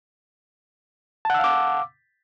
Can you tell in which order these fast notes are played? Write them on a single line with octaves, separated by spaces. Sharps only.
A5 F#5 E6 F5 D6